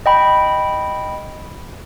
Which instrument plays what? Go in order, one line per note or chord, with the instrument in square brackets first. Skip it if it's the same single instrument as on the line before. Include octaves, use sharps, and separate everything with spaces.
[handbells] D#5 G5 B5